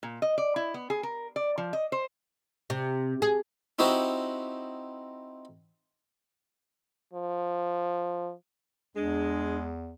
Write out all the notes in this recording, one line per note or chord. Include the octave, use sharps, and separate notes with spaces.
A#2
D#5
D5
E4
B3
G#4
A#4
D5
F3
D#5
C5
C3
G#4
C4 D#4 E4 F#4 G4 C5
F3
E2 G#3 D4